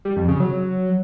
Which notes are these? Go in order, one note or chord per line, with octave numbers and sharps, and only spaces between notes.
G3
F2
C#3
F#3